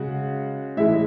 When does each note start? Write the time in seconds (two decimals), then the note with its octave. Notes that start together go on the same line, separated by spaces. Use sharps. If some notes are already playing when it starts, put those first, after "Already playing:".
Already playing: C#3 G#3 F#4 F#5
0.77 A2 E3 G#3 E4 E5